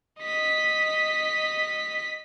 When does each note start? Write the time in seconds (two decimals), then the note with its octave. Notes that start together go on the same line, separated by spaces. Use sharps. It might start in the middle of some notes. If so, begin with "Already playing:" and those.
0.20 D#5 B6